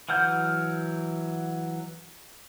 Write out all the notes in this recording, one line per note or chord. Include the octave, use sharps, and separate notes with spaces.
E3 F#3 F#5 F6 G6